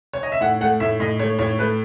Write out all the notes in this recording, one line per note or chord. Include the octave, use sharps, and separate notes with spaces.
C#5
D#5
E5
A2 F#5
A3 F#5
A2 E5
A2 D#5
A3 C#5
A2 C#5
A3 B4